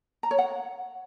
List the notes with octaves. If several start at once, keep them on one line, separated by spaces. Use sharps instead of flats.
A#5
C#5
F#5